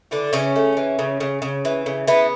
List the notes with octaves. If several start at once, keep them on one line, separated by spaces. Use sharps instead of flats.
D3 E3 D4
C#3 E3 C#4
A3
E3
C#3
C#3
C#3
E3
C#3
E3 B3